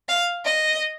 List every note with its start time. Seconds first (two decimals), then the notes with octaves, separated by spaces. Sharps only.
0.09 F5
0.45 D#5